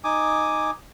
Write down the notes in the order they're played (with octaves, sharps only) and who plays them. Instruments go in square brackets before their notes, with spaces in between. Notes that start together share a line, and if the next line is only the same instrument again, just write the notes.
[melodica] D#4 G#5 D6 D#6